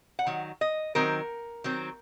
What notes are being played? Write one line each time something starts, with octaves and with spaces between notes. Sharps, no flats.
F#5
D#3 F#3
D#5
D#3 F#3 C4 A#4
D#3 F#3 C4